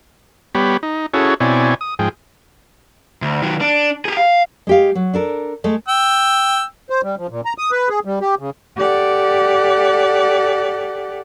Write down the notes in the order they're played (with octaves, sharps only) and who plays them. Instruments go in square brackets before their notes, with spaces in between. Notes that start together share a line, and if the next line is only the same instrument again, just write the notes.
[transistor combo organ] G3 B3 G4 C#5 B5
D#4
C#4 E4 F#4 G#4 A4 C#5
B2 C4 E4 C#5 D5 G#5
D#6
G#2 F3 G#4 G5
[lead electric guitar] D2
D#3 F#3
D4
G4 G#4
F5
[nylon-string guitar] G#3 G4 F5
F#3
D4 A4 A#4
G#3 A3
[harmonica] G5 E6
[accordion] C5
G3
F3
A#2
A#5
D#6
B4
G#4
G3
G4
C#3
[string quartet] G4 A4 D5 F#5